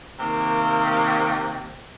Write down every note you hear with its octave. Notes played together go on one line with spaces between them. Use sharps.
C3 D#3 A#3